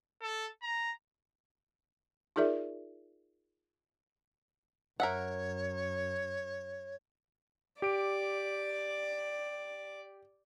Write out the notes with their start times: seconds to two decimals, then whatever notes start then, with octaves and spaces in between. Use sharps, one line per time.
0.22 A4
0.62 A#5
2.36 D#4 F4 G#4 A#4 D5 E5
5.00 F#2 A#4 C#5 E5 F#5
7.82 G4 D5 D7